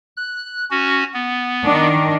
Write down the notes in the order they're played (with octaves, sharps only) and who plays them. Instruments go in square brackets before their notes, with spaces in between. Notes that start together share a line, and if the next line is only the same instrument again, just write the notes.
[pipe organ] F#6
C#4 F#4
B3
[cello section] D#3 D4